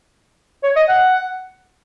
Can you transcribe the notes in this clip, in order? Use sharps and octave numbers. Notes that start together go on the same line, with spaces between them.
C#5
D#5
F#5